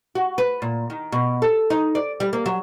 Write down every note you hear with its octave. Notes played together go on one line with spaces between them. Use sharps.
F#4
B4
A#2
D#3
B2
A4
D#4
D5
G3
A#3
F#3